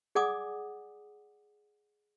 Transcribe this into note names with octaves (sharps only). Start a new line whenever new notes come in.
G#4 D5 F#5 G#5 D6 D#6